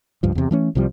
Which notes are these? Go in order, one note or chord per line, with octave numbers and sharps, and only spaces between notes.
C#2 G2 F3
E2 C3
E3 A3 C#4
C2 C3 F3 G3